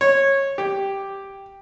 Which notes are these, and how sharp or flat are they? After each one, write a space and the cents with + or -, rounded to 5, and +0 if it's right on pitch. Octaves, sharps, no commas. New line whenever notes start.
C#5 -15
G4 +0